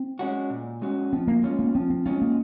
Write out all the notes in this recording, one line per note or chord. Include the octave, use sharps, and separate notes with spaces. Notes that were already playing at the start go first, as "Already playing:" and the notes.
Already playing: C4
G#3 C#4 F#4
A#2
G#3 C#4 F#4
F3 C4
A#3
G#3 C#4 F4
A#3
F3 C4
C4
G#3 C4 C#4 F4
A#3